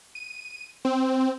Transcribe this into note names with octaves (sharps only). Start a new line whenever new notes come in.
D#7
C4